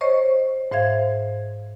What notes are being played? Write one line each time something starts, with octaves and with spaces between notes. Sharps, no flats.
C5 C#5 D#5 C#6
G#2 C5 E5 F5 G#6